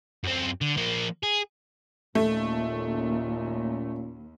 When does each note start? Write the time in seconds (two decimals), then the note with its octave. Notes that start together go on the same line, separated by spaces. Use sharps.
0.24 F#2 C4
0.61 D3
0.77 F3 A#3
1.23 G#4
2.15 D#2 A#2 A3 C#4